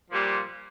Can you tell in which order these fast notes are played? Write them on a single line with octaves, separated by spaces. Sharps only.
F3 A#2 G3